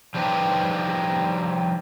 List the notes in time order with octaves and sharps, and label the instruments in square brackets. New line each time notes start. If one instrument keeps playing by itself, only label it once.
[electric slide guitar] F3 G3 D4 D#4 G4 B4